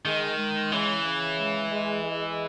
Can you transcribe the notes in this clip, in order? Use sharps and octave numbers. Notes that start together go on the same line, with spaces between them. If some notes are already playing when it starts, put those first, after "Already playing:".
D#3 G#3
G#3
C#3 E3
C#3
G#3
G#3
G#3